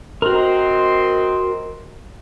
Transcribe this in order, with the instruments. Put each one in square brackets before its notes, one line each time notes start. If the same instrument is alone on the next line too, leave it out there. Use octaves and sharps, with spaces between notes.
[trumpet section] C4 D#5 C6 [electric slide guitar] F#4 A#4